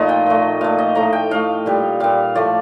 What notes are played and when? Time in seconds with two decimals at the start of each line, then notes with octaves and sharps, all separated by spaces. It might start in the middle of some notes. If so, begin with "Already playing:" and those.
Already playing: A#2 F3 A3 D#4 F4 D#5
0.09 G5
0.26 A#2 A3
0.61 A#2 A3 F5
0.78 D#5
0.95 A2 A3 A#5
1.13 G5
1.31 A2 A3 F5
1.66 A#2 G3
2.00 A#2 G3 F5
2.35 A2 F3 A3 D5